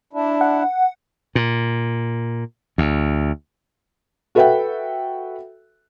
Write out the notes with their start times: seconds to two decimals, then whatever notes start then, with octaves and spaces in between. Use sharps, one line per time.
0.13 D4 E4
0.41 F#5
1.35 A#2
2.78 D2
4.35 F#4 A4 B4 E5 F#5 G5